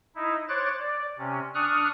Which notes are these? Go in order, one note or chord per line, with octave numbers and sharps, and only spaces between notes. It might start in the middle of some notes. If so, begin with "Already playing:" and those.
D#4 E4
C5 C#5 D6 F#6 A6
D5
C3 C#4
D4 C#6 D#6 F6 F#6